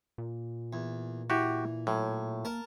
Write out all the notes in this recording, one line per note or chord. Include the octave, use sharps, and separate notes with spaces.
A#2
E2
E3 F#4 G4
A2 F#3
A#3 A#4 A5